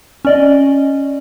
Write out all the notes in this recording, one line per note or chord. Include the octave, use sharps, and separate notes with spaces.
C#4 D5 D#5